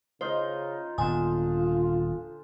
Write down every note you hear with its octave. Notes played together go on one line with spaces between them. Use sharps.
C#3 D#4 F4 C5
D#1 D3 B3 F4 C5 G#5 D#6